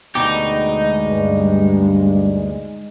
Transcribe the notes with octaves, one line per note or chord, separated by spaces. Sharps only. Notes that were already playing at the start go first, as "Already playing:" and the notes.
D2 B2 G#3 D#4 G4
G2